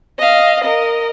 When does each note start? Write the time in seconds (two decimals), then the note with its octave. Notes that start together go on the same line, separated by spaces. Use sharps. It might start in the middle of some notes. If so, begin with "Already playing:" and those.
0.19 D#5 F5
0.62 A#4 D#5